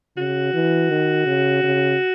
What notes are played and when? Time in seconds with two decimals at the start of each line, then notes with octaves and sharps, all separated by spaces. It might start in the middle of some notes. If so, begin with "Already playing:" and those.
0.17 C#3 F#4
0.54 E3
0.90 D#3
1.27 C#3
1.63 C#3